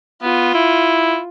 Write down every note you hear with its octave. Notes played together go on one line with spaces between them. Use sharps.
B3 F4
E4